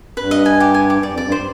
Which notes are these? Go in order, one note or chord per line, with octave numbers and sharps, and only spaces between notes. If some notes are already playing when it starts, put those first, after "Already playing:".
G2 B4
D#5
G#5
G4
G#5
D6
D5
F2
G2 D5
C5